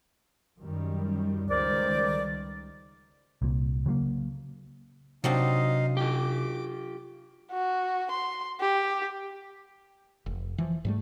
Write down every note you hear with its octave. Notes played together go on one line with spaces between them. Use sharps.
F#2 D#3 G3
C#2 D#3 G3 A#4 C5 D5
C2 A#2
C#3 F#3 G#3 A#3
C3 F#3 C4 D4 D#4 D#5 F5
F4 G4 D6
F#4
C6
G4
F1
E3 F3
G#2 G3 A3